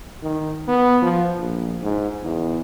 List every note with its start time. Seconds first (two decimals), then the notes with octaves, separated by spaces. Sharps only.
0.23 D#3
0.68 B3
1.02 F3
1.39 A#1
1.82 G#2
2.23 E2